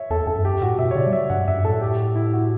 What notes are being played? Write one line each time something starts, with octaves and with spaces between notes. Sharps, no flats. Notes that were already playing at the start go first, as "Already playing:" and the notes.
Already playing: C#5 E5
E2 A4
F#2 A4
G2
F#2 G4
A2 F#4
B2 E5
C#5
C#3 D5
G3
F#3 E5
G2 F#5
F#2 E5
G2
A2 A4
G4
E4
F#4